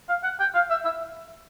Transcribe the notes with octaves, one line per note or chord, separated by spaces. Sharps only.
F5
F#5
G5
F5
E5
E5